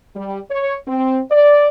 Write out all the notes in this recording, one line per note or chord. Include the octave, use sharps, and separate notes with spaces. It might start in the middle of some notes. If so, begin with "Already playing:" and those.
G3
C#5
C4
D5